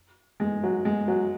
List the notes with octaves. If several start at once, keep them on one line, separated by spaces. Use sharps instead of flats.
G#3
F#3
G#3
F#3